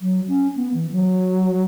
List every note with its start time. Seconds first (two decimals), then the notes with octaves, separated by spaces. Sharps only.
0.01 F#3
0.28 C#4
0.56 B3
0.74 E3
0.92 F#3